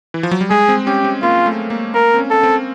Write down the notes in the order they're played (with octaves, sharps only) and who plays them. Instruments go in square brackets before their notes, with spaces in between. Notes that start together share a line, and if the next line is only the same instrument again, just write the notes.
[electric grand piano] E3
F3
F#3
G3
[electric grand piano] G#3 [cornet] G#4
[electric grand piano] C4
[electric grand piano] C#4 [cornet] G4
[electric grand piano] C4
[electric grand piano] A#3 [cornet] F4
[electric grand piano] A3
A#3
[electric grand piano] A#3 [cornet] A#4
[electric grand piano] C4
C#4
[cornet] A4
[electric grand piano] C4